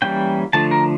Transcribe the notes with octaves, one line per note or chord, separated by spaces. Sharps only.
E3 G3 A#3 C#4 G5
D3 F3 A3 A5
A#4